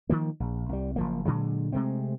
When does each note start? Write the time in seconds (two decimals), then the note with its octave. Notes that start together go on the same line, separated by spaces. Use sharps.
0.10 D#3 F3 A#3
0.40 A#1
0.69 C2 G3
0.96 F#1 F3 A#3
1.25 A#2 D3 F#3 G#3
1.72 C3 G#3 A3 C4